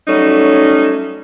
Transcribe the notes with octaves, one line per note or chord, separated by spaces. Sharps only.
F#3 G3 A3 C#4 D#4